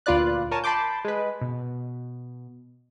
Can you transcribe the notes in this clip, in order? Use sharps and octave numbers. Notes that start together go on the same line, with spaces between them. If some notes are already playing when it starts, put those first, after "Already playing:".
D2 A#2 F4 B4 D5 F#6
A#4 C#5 G#5 A5
A5 B5 C6 D6 G6
G#3 B4
B2